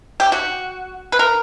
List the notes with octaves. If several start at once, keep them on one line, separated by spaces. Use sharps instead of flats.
G4
F#4
B4
A#4